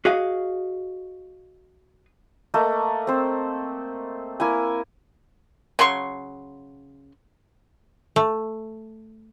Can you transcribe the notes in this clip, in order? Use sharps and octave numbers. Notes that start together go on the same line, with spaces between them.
F#4 G#4 D#5 F5
A3 A#3 D#5
C4 C5
A#3 E4 G#5
C#3 F#3 C6 C#6
A3